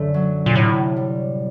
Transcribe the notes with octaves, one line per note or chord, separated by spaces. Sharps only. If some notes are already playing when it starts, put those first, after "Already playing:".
Already playing: F#2 D3 A3
F#3
A#2
A2 C3
G3